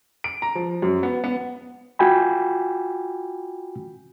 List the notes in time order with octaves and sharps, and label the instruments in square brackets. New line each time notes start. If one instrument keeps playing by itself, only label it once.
[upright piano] D7
A#5
F3
F#2
B3
B3
[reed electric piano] F4 F#4 G5 G#5 B5